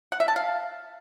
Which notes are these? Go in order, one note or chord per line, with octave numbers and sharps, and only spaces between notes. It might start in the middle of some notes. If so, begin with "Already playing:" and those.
F#5
E5
A5
F5